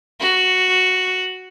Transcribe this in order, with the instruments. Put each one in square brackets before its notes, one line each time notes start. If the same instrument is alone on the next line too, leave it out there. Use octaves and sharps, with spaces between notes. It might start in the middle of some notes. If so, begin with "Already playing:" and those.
[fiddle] F#4